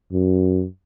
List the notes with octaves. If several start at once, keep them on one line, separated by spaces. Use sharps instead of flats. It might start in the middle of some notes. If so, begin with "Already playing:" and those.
F#2